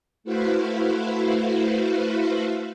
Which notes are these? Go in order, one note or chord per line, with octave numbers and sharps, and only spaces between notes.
A3 E4 F#4 B4 C5 F5